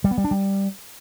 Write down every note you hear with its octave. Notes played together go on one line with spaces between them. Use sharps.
G3
B3
G3
D4
G3